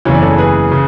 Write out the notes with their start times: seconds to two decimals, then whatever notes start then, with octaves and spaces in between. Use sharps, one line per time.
0.05 F#1 E2 C#3 E3 C#5
0.14 D5
0.22 A4 C#5
0.38 G#4 B4
0.71 C#3